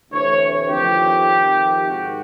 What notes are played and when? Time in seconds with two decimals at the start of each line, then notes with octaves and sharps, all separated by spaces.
0.11 D2 C3 E3 C#5
0.69 F2 C3 D#3 G4
1.29 F2 C3 D#3
1.87 G#2 D#3 F#4